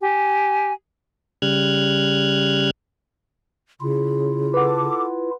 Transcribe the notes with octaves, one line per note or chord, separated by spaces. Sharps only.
G4 G#5
C#3 G3 F6 F#6 G#6
C#3 E4 F4
A4 B4 F#5 D6